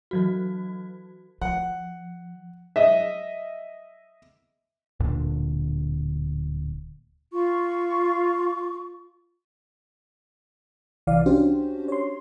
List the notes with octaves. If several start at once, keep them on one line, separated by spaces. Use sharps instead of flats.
E3 F#3 F#4
F3 F#5
D#5 E5
D1 D2 A#2 D3
F4 C#6
C2 E3 D5 F5
C#4 D4 F#4 G4 C5
C#5 C6